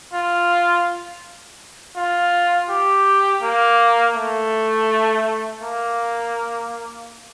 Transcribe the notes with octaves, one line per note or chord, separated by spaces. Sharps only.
F4
F4
G4
A#3
A3
A#3